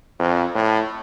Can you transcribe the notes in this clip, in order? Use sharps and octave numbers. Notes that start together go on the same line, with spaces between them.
F2
A2